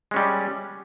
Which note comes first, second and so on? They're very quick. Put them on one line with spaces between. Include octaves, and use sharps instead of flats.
G#3 C#4 G3